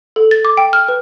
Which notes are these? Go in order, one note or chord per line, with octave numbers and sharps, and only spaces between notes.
A4
A6
D6
G5
F6
B4